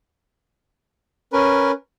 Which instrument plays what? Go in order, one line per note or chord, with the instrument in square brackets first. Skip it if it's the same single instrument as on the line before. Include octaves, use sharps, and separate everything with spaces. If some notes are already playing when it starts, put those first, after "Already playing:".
[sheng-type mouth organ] C#4 A#4 B4